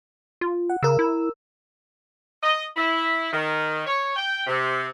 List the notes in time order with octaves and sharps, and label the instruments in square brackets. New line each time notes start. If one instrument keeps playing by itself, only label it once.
[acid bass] F4
[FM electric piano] F#5
[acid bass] C#3 [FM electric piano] A#4 E6
[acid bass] E4
[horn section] D#5
E4
D#3
C#5
G5
C3